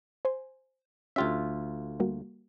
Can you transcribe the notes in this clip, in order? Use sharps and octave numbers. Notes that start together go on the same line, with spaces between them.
C5 G#5 C6
D2 C#4 F4 G4 E5 F5
G3 A#3 F#4